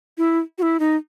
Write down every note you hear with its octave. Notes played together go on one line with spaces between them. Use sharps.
E4
F#4
E4
D#4